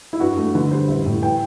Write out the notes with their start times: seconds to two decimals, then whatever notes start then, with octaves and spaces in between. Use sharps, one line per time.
0.13 E4
0.20 G2 F#4
0.37 A3
0.54 D3 B4
0.71 G3 C5
0.88 A1 E5
1.06 A2
1.22 E3 G5